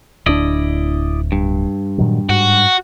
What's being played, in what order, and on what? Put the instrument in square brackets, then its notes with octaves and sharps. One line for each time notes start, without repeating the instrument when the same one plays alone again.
[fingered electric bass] D1 D2 D4 [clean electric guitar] E4 D5 D#5
[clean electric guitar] G2
[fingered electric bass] A#2 D#3 F#3
[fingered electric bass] G#2 [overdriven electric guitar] F#4